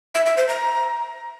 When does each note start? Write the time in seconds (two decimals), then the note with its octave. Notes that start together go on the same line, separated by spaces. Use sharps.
0.15 E5
0.26 E5
0.37 C5
0.49 A#5